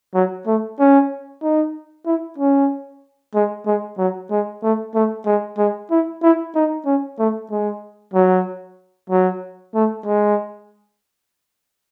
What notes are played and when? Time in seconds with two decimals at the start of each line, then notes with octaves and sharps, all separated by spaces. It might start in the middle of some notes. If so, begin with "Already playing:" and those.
0.15 F#3
0.47 A3
0.80 C#4
1.43 D#4
2.06 E4
2.38 C#4
3.35 G#3
3.67 G#3
3.98 F#3
4.31 G#3
4.63 A3
4.95 A3
5.26 G#3
5.58 G#3
5.91 E4
6.23 E4
6.55 D#4
6.86 C#4
7.19 A3
7.51 G#3
8.14 F#3
9.10 F#3
9.75 A3
10.06 G#3